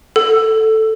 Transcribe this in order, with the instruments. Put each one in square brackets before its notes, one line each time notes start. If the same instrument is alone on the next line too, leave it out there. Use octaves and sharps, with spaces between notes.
[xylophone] A4